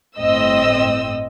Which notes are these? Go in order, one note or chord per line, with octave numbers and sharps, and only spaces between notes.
G1 A2 C4 D#5 E6